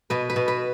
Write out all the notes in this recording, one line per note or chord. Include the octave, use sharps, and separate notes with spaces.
B2 B4
B4
B2
B4